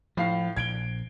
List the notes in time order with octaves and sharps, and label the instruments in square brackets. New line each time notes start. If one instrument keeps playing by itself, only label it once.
[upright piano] A2 F5 C7 [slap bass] F3
[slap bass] A#1 [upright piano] G#6 D7 G7